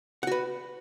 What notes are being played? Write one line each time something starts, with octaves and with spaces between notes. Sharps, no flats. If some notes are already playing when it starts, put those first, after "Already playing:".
F#4 B4 F#5